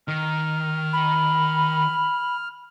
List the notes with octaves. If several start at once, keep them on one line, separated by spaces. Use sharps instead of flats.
D#3 F6
B5